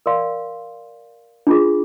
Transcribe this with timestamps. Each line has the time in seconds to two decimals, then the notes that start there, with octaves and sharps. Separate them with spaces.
0.06 A#4 D5 F5 C6
1.47 D4 F4 G#4